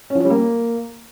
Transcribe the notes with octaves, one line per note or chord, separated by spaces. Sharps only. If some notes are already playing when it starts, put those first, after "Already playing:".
C#4
F3
C#4
G3
A#3